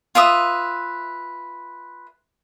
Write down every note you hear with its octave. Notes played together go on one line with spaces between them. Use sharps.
F4 B4 E5 D#6